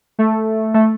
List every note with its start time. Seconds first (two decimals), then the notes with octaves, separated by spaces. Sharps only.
0.19 A3
0.74 A3